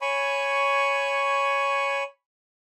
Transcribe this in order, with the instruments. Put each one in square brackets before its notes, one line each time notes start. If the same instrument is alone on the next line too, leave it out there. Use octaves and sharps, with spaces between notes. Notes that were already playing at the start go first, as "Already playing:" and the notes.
[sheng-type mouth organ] C#5 G#5 B5 C#6